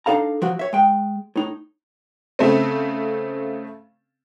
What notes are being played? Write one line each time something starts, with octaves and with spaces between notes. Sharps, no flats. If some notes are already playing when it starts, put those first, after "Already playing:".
D4 D#4 A4 F5 A#5
F3 F#3 F#4
C#5 E5
G#3 G5
A2 D#4
C#3 A3 C4